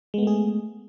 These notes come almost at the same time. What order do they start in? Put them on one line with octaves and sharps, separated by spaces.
G#3 B3 A3 G#4